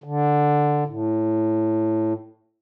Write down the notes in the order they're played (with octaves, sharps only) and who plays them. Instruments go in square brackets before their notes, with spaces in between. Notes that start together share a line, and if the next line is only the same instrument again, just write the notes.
[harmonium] D3
A2